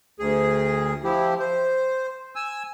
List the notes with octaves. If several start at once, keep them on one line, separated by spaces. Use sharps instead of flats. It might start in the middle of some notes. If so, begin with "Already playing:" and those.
D2 G#4
F3 E4 G4
C5
G#5 E6